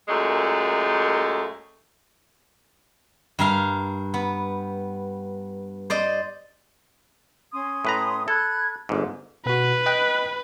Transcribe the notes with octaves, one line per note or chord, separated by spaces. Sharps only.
F#2 A#2 G#3 A3
G2 A#4 F5
B3
C5 D5 D#5
C#4 C6 D#6
A2 B4 A#5
A4 B5 F#6 G#6
G1 G#2 D6
B2 F#4 B4
D#5 G5 F#6